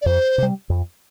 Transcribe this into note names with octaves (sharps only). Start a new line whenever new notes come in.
D5
F2 C5
C3 G3
F2